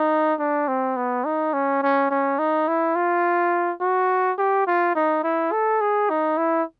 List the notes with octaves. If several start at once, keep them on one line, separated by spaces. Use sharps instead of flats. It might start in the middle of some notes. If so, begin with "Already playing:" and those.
Already playing: D#4
D4
C4
B3
D#4
C#4
C#4
C#4
D#4
E4
F4
F#4
G4
F4
D#4
E4
A4
G#4
D#4
E4